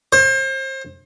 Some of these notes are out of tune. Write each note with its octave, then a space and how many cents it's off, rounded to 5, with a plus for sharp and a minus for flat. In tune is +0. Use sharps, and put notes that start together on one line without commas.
C5 +35